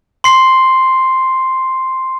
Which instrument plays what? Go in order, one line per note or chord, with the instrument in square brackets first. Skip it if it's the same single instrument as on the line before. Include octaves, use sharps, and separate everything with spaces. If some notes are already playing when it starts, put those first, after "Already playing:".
[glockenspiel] C6 C7